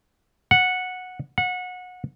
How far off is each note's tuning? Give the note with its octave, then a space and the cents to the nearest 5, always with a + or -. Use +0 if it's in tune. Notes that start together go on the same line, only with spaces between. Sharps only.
F#5 -10
F#5 -25